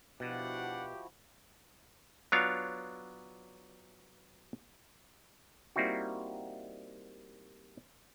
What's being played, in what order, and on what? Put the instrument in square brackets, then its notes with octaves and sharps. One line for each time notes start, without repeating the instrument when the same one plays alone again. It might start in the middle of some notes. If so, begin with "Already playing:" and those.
[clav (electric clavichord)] B2 [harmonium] F3 E4 F#4 [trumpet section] D4 F#5 [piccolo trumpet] G4
[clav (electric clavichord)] F#3 B3 D4 F4 C#5 F5
G3 A#3 C4 D#4 E4 F#4